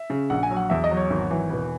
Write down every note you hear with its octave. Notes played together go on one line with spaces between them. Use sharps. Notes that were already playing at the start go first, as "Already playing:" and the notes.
Already playing: E5
C#3
A#1 F#5
G#5
F#3
F#5
E2 E5
D#5
F#3
C#5
G#1
E3
E1 B4